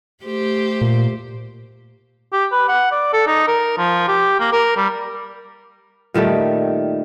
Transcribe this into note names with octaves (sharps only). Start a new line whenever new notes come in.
A3 G4 C5
A#2
G4
B4
F#5
D5
A4
D#4
A#4
F3
G4
A#3
A#4
G3
A#2 D#3 G3 A3